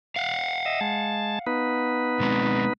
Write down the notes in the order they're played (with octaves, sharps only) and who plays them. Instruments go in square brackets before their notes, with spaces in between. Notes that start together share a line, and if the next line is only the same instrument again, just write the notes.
[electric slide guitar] F5 F#5
[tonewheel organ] D#5 E5
G#3 A5
B3 D#4 B4
[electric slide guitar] B2 G#3 C4